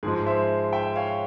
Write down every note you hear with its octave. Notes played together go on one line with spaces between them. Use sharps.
G#2 F3 G#3 G#4
C5 E5
E5 G5
C#5 F5